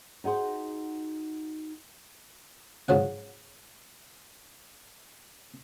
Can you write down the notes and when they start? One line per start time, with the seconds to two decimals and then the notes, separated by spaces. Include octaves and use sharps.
0.24 D#4 F#4 G#4 C5
2.88 G#2 F3 F#3 F#5